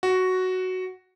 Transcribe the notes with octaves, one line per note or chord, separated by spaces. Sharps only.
F#4